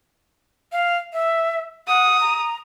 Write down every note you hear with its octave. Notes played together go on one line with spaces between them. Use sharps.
F5
E5
F#5 D#6
A#5